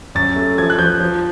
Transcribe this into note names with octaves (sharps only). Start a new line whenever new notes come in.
F#2 A6
A3
F3 G#6
F#6
F3 G6
F3